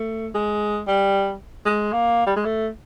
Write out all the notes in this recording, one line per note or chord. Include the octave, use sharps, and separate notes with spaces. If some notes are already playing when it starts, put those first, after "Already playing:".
Already playing: A3
G#3
G3
G#3
A#3
G3
G#3
A3